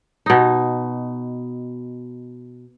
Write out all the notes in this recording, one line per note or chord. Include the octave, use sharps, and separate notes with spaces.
B2 D#4